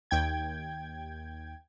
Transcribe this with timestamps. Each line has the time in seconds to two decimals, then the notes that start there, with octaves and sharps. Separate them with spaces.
0.11 D#2 G5 G#6